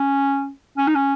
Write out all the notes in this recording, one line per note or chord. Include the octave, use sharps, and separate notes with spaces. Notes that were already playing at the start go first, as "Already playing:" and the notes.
Already playing: C#4
C#4
D#4
C#4